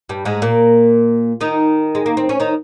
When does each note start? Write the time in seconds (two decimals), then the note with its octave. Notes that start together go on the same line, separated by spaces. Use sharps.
0.09 G2 G3
0.25 G#2 G#3
0.42 A#2 A#3
1.41 D#3 D#4
1.95 G#3
2.06 A#3
2.17 C4
2.29 C#4
2.40 D#3 D#4